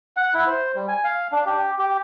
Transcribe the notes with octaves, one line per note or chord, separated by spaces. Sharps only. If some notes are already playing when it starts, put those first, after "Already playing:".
F#5
E4
C5
G3
G#5
F5
D4
G4
G4